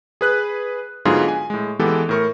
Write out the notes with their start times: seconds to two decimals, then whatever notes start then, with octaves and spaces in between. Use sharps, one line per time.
0.21 G#4 B4 F#6
1.05 G#2 D3 F#3 B3 F4 G#4
1.28 G#5
1.50 A2 G#3
1.79 E3 G#3 B3 G4 A4
2.09 A2 A#4 C#6